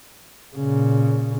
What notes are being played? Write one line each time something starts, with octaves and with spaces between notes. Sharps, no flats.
A#2 C#3